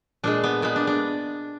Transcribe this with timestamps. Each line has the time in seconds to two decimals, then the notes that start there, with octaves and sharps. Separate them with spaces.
0.24 A#2 G#3 D4
0.44 B3
0.62 A#2 G#3 B3
0.76 D4
0.87 D4